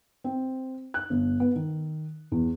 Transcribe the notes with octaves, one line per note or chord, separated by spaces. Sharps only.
C4
F#6
G1
B3
D#3
E2